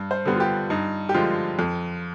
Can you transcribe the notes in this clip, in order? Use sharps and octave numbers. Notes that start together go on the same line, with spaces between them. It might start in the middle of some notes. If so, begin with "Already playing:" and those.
Already playing: G2
C5
D3 G3 B3
F4
G4
G2 D#4
G4
D3 F3 G#3 F4
F2